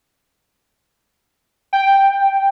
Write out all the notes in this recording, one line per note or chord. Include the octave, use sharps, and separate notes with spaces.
G5